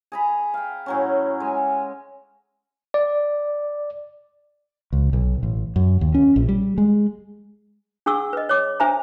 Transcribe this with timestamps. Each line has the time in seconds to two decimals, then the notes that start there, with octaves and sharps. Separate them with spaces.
0.12 G#4 A#5 B5
0.54 F5 G5
0.86 A2 F#3 C#4
1.40 G#3 G#5
2.94 D5
4.93 C#2
5.13 B1
5.43 A1
5.76 F#2
6.01 D#2
6.14 C#4
6.36 A#1
6.49 G3
6.78 G#3
8.06 D4 G#4 F#5 C#6 E6
8.33 B4 D#5
8.49 C#5 D6
8.80 D4 C5 E5 G#5 A#5